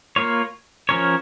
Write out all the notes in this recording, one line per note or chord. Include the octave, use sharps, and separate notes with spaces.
A#3 F4 C#5
F3 C#4 A#4 C#5